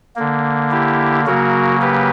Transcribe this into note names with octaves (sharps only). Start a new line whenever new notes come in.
D3 A#3
E4 G4
C#3 F#3 A#3 F#4 A#4
G4 B4